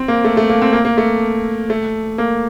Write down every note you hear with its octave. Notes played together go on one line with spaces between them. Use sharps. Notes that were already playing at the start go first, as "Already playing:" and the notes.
Already playing: C4
A#3
A3
A3
A#3
C4
A#3
A#3
A3
A3
A#3